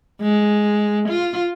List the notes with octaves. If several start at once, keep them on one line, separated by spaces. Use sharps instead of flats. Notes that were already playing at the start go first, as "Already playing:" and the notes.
G#3
F4